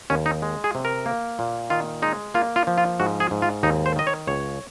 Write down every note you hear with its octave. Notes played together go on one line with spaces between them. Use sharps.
D#2 C#4
D#4
G#3
G#4
C3
A#4
A#3
A#2
D#3 F4
G#3 D#4
A#3 F4
F4
F3
F4
G#2 F#4
G#4
G#2
F4
D#2 D#4
C5
D#3 D#5
C#5
C#2 C#5